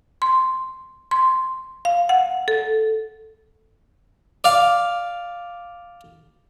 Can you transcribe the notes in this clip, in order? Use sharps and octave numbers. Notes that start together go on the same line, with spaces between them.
C6
C6
F5
F#5
A4
D5 F5